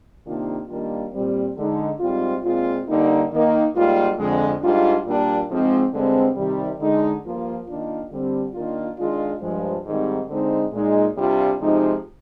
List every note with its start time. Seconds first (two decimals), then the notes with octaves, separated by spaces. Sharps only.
0.25 C3 D#3 A#3 D4 F4
0.68 D#3 G3 A#3 D4 F4
1.12 A#2 G3 C4
1.56 D3 G#3 D#4
2.00 G#2 G3 C4 F4
2.43 A#2 G#3 C4 F4
2.88 D3 G3 A#3 D#4
3.30 D#3 A#3 D#4
3.75 G#2 G3 A#3 F4
4.17 F2 D3 G#3
4.61 G#2 G3 D4 F4
5.05 A#2 G3 A#3 D4
5.49 G#2 F3 G#3 C4
5.93 G2 D3 G#3 C4
6.35 C3 D#3 G3
6.79 D3 G#3 D#4
7.23 G2 F3 A#3 F4
7.66 D#3 A#3 D4 F4
8.10 D3 G3 C4
8.54 D#3 A#3 D4 F4
8.98 D#3 G#3 D4 F4
9.40 G2 F3 G#3
9.85 G#2 D#3 G3 C4
10.28 D3 G#3 C4 D#4
10.72 A#2 G#3 D#4
11.16 C3 G3 D4 F4
11.59 C3 F3 G#3 D#4